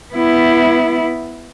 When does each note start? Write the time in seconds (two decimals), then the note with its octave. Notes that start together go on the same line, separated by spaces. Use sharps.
0.14 B3 E4